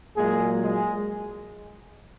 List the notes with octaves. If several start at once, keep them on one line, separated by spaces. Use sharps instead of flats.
A#2 F#3 G#3 A#3 G#4
G#3 G#4